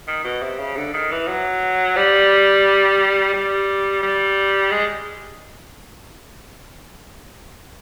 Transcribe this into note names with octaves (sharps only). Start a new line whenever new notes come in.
D#3
B2
C3
C#3
D3
D#3
E3
F#3
G3
G3
G3
G#3